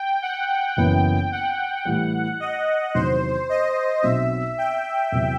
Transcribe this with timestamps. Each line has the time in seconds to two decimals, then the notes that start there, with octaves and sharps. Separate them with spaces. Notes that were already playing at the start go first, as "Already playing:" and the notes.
Already playing: G5
0.22 F#5
0.77 F#1 F#2 E3 B3 G5
1.32 F#5
1.85 A2 E3 G3
2.40 D#5
2.94 E2 C3 D#3 F#3 C5
3.49 D#5
4.03 B1 B2 F#3 C4 F#4 E5
4.58 G5
5.12 E2 C3 F#3